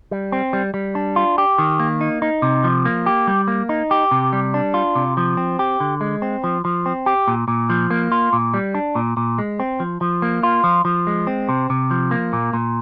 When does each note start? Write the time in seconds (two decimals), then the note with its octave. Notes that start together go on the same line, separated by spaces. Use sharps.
0.11 G3
0.32 C4
0.53 G3
0.74 G3
0.95 D4
1.16 F4
1.38 G4
1.58 D#3
1.80 A#3
2.01 D#4
2.22 D#4
2.42 C3
2.64 F3
2.85 A#3
3.06 G4
3.27 G3
3.48 A#3
3.69 D#4
3.91 G4
4.11 C3
4.33 G3
4.54 D4
4.74 F4
4.95 C3
5.17 F3
5.37 C4
5.59 G4
5.80 D3
6.01 G#3
6.22 C4
6.44 F3
6.65 F3
6.86 C4
7.06 G4
7.28 A#2
7.48 A#2
7.70 F3
7.91 A#3
8.12 F4
8.33 A#2
8.54 G3
8.75 D4
8.95 A#2
9.17 A#2
9.38 G#3
9.60 C4
9.80 F3
10.01 F3
10.22 A#3
10.43 F4
10.64 F3
10.85 F3
11.07 G#3
11.27 C4
11.49 C3
11.70 C3
11.91 F3
12.11 A#3
12.33 A#2
12.53 A#2